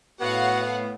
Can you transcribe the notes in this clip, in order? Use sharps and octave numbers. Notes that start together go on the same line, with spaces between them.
A2 B3 F#4 C#5 F5 F#5